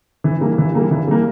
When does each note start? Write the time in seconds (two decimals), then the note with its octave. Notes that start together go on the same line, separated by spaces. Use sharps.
0.24 E3
0.41 G3 A#3
0.58 E3
0.75 G3 A#3
0.91 E3
1.08 G3 A#3